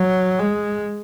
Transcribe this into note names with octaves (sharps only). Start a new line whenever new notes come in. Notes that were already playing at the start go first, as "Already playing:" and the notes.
Already playing: F#3
G#3